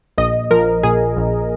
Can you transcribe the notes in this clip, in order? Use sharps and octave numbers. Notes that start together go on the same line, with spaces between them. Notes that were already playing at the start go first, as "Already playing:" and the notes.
A#1 D#5
F3 A#4
A#2 G#4
A#1